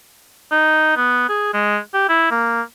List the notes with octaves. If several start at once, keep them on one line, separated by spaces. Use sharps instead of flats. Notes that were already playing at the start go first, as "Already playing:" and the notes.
D#4
B3
G#4
G#3
G4
E4
A#3